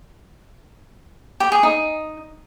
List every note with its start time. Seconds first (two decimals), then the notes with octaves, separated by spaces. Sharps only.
1.40 G4
1.52 G#4
1.63 D#4